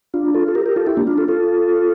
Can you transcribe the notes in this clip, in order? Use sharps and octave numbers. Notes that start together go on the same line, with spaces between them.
D4 F4
F4 A4
A4
G4 A#4
G4 A#4
F4 A4
E4 G4
A#3 D4
D4 F4
F4 A4
F4 A4